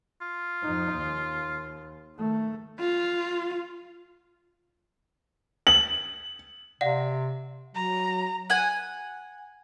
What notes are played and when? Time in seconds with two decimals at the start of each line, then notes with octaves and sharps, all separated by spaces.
0.21 F4
0.63 F2 D#4
0.94 D#2
2.16 D#3 A3
2.80 F4
5.67 F#7
6.81 C3 D5 F5 F#5
7.75 F#3 A#5
8.50 F#5 G#5